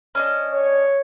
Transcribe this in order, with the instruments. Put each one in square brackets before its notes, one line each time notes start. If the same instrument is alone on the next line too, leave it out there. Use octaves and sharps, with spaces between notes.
[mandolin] C#4 D4 D#5
[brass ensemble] C#5